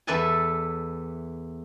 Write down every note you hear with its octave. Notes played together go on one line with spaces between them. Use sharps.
E2 A4 B4 D5 E5 G#5